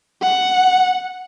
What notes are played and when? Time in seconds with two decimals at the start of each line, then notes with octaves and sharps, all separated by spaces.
0.22 F#5